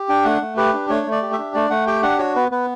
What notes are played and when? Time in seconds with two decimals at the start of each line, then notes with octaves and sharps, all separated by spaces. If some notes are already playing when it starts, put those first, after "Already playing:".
Already playing: G4
0.09 D4 G5
0.25 A3 F#5
0.41 A3
0.57 G4 B4
0.73 D4
0.90 A3 C#5
1.07 A3
1.12 D5
1.22 G4
1.33 E5
1.38 D4
1.55 A3 D5
1.70 A3 F#5
1.87 G4 G5
2.03 D4 F#5
2.19 F#4 C#5
2.36 B3 B4
2.51 B3 B4